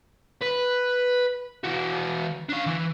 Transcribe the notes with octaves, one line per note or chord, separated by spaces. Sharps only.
B4
E3 F#4
D4 F5
E3 E4